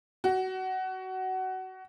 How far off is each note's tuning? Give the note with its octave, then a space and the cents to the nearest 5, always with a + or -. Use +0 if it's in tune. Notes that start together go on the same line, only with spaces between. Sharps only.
F#4 +20